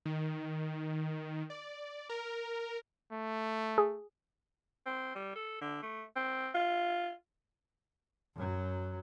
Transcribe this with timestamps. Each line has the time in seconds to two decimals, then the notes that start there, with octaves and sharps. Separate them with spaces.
0.05 D#3
1.50 D5
2.09 A#4
3.12 A3
3.78 G#4
4.86 C4
5.15 G3
5.36 A4
5.61 D3
5.83 A3
6.16 C4
6.55 F4
8.35 F#2 F#3